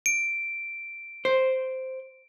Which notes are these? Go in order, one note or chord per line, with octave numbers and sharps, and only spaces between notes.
D7
C5